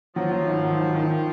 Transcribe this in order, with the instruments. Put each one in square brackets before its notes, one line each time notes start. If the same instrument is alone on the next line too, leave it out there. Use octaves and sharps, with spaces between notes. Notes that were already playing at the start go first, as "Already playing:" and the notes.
[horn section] F3 [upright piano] F#3
[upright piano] F#3
G#1
F#3
G#1
D#3